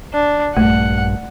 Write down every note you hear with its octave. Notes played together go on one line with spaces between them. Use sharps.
D4
A#1 G2 A3 F#5